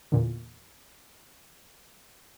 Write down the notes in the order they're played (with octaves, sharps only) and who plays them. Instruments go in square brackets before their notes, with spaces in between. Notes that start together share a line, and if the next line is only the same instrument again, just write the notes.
[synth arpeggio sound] E2 A#2 D3